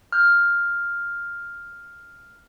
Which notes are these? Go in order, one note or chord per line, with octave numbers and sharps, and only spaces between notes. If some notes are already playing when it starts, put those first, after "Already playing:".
F6 G6